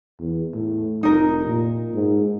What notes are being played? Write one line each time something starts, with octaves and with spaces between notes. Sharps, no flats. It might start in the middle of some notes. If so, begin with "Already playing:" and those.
E2
A2
F1 D#4 A#4
A#2
G#2